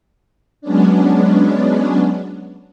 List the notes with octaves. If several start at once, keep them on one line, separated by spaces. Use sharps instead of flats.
F#3 G#3 B3 C#4 D4